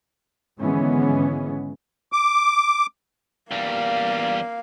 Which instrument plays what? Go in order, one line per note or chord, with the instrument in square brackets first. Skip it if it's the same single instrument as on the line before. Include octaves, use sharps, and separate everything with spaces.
[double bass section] G#1 D3 E3 G#3 B3 C#4
[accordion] D6
[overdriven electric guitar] E2 G3 [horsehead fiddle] A#3 F5